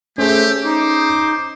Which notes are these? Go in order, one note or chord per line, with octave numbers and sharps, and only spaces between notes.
A3 C#4 G4 G#4 C5
D#4 C5 D6